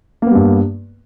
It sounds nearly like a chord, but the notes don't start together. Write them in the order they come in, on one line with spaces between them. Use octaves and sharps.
A#3 B3 G3 G2